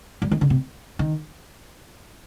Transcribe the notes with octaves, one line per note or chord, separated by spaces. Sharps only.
G3
D#3
D3
C3
D#3